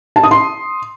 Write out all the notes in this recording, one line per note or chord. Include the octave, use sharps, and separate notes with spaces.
A5
D#6
C6